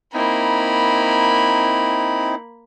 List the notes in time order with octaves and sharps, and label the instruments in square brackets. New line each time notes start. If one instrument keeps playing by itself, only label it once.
[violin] A#3 B5 [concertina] C4 D#4 E4